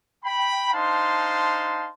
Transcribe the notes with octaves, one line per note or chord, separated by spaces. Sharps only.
G5 B5
D4 D#4 C5 F5 A5 C6